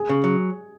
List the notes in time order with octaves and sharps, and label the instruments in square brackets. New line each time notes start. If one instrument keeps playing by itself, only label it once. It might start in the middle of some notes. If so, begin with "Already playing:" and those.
Already playing: [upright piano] G#4
[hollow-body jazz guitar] C#3
F#3